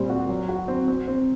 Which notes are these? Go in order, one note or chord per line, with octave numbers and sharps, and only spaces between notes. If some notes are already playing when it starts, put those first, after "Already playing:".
Already playing: A#2 G3 C4
F#4
F#3
F#4
C4
C4
C4